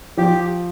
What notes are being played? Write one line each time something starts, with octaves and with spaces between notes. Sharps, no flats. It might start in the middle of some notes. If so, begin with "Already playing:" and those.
F3 G4